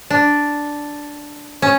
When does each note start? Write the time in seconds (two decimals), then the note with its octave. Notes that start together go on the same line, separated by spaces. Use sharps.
0.10 D4
1.62 C#4